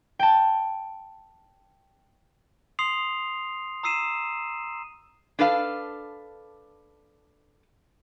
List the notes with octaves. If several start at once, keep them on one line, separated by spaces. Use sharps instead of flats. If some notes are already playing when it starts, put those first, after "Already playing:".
G5 A5
C6 D#6 C7 F7
A#5 D#6 E6 C7 D#7 E7
D4 A4 B4 F5